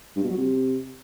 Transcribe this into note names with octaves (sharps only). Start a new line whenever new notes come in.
G2
B2
F#3
C3